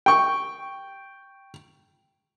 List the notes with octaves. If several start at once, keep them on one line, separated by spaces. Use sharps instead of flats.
G5 C#6